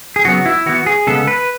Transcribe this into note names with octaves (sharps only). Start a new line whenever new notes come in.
G#4
C#3 F#3 B3 F#4
E4
E3 B3 F#4
G#4
C#3 G#3 B3 A4
B4